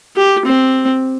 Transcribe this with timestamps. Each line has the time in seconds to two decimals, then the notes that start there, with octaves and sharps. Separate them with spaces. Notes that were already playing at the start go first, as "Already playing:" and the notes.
0.16 G4
0.46 C4